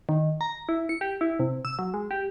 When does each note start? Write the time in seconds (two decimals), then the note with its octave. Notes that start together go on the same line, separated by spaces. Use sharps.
0.09 D#3
0.41 A#5
0.69 E4
0.89 C#7
1.01 G4
1.21 E4
1.39 C3
1.65 E6
1.79 F#3
1.94 G#3
2.11 G4